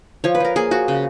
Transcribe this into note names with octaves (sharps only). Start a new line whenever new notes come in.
F3 C#5
B4
F3 A#4
A#3 G#4
F3 F#4
C#3